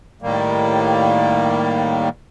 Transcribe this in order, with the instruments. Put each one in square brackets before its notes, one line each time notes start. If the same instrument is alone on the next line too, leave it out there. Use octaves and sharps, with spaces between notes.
[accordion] A2 D#3 G3 A#3